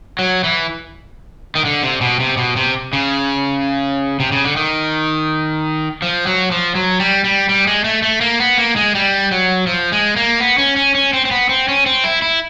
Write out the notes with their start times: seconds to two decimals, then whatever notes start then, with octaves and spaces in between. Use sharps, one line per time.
0.19 F#3
0.44 E3
1.55 D#3
1.65 D3
1.83 C3
2.01 B2
2.20 C3
2.37 B2
2.56 C3
2.93 C#3
4.20 C3
4.32 C#3
4.44 D3
4.56 D#3
6.02 F3
6.27 F#3
6.51 F3
6.75 F#3
7.00 G3
7.24 G3
7.49 G3
7.67 G#3
7.84 A3
8.02 A3
8.21 A#3
8.40 B3
8.58 A#3
8.76 G#3
8.95 G3
9.31 F#3
9.67 F3
9.92 G#3
10.16 A#3
10.40 B3
10.58 C#4
10.76 C#4
10.95 C#4
11.13 C4
11.25 C4
11.31 B3
11.49 C4
11.68 C#4
11.86 C4
12.04 E4
12.22 E4